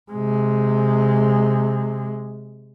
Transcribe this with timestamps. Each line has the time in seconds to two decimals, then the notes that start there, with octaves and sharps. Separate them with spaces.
0.12 C3 G#3